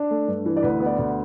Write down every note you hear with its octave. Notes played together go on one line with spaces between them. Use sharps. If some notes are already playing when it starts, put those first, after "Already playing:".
Already playing: D4
A3
G2
E3
D5
D2 B4
B3
D5
D2